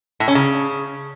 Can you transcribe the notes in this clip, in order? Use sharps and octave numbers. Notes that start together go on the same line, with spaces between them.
A2
C#4
C#3